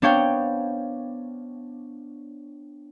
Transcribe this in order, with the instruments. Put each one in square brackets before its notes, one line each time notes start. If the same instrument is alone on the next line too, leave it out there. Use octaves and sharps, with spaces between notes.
[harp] B3 D4 C5 C#5 F5 G5